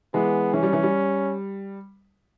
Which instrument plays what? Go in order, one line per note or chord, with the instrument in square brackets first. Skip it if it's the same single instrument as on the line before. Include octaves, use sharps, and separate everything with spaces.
[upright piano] E3 G#3 [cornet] B3
[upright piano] E3 [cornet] C#4
[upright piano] G3
E3
G3